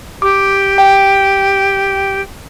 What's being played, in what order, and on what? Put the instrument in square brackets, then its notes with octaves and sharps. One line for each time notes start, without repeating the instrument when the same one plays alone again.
[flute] G4 [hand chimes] D6
[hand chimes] G5